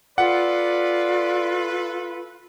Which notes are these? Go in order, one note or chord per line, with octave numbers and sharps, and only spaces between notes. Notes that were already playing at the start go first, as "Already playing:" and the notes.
F4 A4 B4 D5 F#5